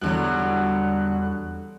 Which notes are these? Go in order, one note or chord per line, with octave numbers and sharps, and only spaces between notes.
E2 B2 D3 F#3 G3 F#6